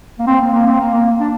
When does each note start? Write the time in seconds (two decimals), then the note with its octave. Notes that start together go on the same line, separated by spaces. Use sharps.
0.19 A#3
0.27 C4
0.41 A#3
0.53 A#3
0.67 C4
0.80 A#3
0.94 A#3
1.20 D4